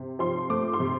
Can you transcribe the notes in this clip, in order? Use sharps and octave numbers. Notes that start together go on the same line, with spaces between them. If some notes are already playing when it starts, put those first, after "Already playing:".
Already playing: C3
F3 C6
A3 D6
C6
C3